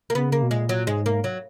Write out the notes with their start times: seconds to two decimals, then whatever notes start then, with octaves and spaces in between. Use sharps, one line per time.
0.10 A#3
0.15 C#3 B3
0.32 A#3
0.43 B2
0.51 A#2 G#3
0.69 F#3
0.87 G#2 G#3
1.06 A#3
1.24 F#3